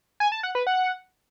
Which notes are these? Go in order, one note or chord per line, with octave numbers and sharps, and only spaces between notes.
G#5
A5
F#5
B4
F#5